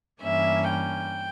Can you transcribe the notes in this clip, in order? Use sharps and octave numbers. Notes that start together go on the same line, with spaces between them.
G2 E3 A#3 C#4 E5
G5